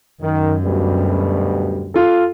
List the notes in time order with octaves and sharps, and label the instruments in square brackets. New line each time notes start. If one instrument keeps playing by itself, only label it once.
[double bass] F#2 [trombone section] D#3
[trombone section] D2 B2 G3
[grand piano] F4 A4